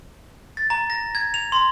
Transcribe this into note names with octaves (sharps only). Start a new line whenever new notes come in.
A6
A#5
A#6
G#6
F7
C6